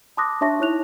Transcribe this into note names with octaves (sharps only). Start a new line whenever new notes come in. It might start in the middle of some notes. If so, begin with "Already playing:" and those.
A5 C6 D6 D#6 F#6 A#6
D4 C#5 E5 A5 C#6 A#6
D#4 E4 C#5 F#6 F7